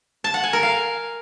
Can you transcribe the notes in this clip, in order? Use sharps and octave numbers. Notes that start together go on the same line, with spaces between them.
A5
F#5
G#5
A#4
F5